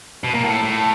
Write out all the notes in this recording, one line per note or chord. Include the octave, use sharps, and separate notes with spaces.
B2
A#2
A2
A2